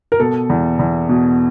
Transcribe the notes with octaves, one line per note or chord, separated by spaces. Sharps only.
A#4
B2 A4
E2
E2
B2